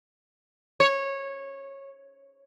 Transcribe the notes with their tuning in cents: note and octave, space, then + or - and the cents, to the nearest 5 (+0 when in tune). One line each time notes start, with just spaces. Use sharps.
C#5 -15